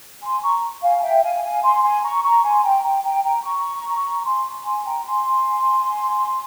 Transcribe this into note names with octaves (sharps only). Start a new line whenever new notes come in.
G#5 C6
A#5 C#6
F5 G#5
G#5
E5 G5
F5 G#5
F5 G#5
G#5 C6
G#5 C6
A#5 C#6
A#5 C#6
G#5 C6
G5 A#5
G5 A#5
G5 A#5
G5 A#5
A#5 C#6
G#5 C6
G#5 C6
G5 A#5
G#5 C6